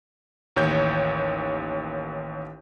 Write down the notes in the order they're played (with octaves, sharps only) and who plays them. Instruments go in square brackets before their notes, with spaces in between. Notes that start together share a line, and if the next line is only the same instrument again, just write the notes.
[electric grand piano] A1 D#2 C#5 G6